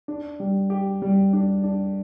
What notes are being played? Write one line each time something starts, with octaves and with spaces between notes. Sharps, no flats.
D4
G3
G4
G3
D4
D4